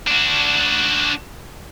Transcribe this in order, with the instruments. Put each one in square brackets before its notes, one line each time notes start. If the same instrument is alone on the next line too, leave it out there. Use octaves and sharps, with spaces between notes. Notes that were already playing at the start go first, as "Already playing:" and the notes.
[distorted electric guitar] D4 F#4